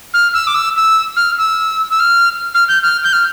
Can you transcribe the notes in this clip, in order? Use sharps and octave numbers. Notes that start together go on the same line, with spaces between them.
F6
E6
D6
E6
E6
F6
E6
E6
F6
F6
G6
F6
G6
F6